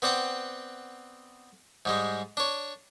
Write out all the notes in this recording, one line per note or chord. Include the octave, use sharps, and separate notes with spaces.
B3 C4 D5 F#5 G5
G#2 G3 G#3
D4 C#5